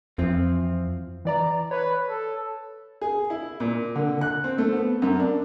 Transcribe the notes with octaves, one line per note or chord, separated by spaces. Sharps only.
F2 E3 F3 C4
E3 D5 A#5
B4 C#5
A4
G#4
E4
A#2
D3
F#6
C4
A3
B3
F#2
D4